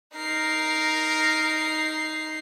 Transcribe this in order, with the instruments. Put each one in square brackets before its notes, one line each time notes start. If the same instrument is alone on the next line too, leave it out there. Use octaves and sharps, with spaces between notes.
[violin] D#4 C7 [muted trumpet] A#4